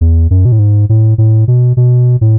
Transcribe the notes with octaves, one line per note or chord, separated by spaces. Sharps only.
E2
F#2
B2
A2
G#2
A2
A2
B2
B2
A2